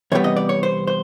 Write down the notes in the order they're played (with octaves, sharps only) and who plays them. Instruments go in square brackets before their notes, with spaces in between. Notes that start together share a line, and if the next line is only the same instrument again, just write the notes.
[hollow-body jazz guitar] E2 C3 G3 B3 C#5
D#5
D5
C#5
C5
C5